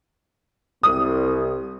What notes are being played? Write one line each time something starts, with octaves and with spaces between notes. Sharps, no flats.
C2 D#6